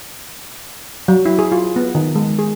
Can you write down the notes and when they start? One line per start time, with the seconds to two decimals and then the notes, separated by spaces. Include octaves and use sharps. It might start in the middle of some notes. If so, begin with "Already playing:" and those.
1.08 F#3
1.25 E4
1.39 G#4
1.52 F4
1.76 B3
1.95 D#3
2.16 G#3
2.39 G#4